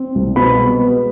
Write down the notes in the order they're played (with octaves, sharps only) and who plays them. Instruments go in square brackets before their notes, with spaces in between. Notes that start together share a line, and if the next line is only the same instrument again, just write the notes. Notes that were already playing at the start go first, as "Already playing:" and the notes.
Already playing: [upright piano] C4
C2
B2 B5
G#3
B3